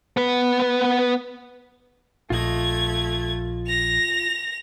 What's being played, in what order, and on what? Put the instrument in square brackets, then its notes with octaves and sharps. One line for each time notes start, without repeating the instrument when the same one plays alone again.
[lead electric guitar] B3 B4
[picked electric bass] A#1 [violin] A3 G#6 [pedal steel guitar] F4 D#5
[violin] A#6 F7